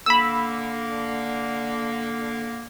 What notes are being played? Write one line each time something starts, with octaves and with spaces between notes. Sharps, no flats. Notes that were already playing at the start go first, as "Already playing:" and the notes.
D3 A#3 B5 E6